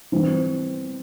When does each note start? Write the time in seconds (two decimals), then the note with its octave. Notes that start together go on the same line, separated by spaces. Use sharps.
0.12 E3 G3 C4